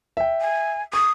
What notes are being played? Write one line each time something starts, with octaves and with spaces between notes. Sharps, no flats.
E5 G5
G#5
C#6 D#6